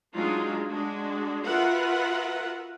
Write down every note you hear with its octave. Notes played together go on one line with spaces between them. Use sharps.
F#3 G#3 D4 D#4 F4
G#3 D4 F#4
F4 F#4 A#4 B4 E5 F#5